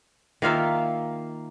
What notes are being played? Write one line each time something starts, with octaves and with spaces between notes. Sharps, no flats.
D#3 A#3 F4 E5